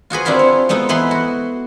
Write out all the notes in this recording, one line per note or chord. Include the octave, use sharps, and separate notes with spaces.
F4 F#4 G#4 B4
C4 D4 E4 F4 A#4
C#5
G#3 B3 D#4 A4
E3 B3 E4 B4 C6
F#4